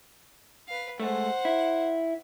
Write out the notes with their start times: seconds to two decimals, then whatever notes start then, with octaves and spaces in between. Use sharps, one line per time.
0.68 B4 F5
1.00 G#3 A3 C5 F#5
1.45 E4